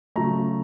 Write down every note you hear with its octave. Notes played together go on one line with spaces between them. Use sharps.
C#3 F#3 A3 A#5